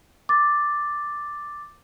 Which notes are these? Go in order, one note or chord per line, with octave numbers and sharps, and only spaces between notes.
D6 A6